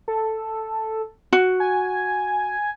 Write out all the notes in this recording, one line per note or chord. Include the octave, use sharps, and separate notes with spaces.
A4
F#4
G#5